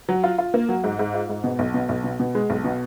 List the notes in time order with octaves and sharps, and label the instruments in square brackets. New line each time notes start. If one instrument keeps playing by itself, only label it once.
[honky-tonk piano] F#3
F4
F4
A#3
F#3
G#2
G#2
F4
G#2
B2
B1
B2
B1
B2
B2
G#3
B1
B2